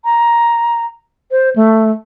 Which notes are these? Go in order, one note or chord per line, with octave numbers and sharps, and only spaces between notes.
A#5
C5
A3